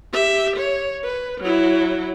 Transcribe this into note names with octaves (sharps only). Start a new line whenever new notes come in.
G4 E5
C#5
B4
F#3 E4